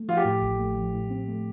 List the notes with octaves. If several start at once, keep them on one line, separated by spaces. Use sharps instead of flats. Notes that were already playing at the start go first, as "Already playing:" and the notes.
Already playing: A3
F3 F4
G4
A2
A1
A3
F3
A2
C4
A3